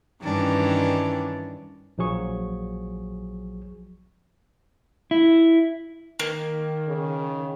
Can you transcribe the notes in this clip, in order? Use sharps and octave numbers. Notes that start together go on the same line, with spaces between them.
G2 D#3 E3 C#4 D4
A#1 F3 F#3 G#4 C#6
E4
D#3 A#3
C#3